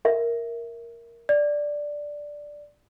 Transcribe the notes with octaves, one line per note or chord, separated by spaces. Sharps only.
A#4 E5
D5